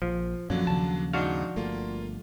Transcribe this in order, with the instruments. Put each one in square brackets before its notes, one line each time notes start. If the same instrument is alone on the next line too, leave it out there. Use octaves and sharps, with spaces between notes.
[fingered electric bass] A#1 [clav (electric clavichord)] F3
[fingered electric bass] F#2 A#2 C#4 [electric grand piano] D3 F#3 D4 [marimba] F3
[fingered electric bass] D#2 C#3 [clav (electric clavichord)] A5
[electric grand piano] G#2 D#4 [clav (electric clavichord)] D4 F#4 F5
[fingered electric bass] G1 A3 [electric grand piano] A#3 F4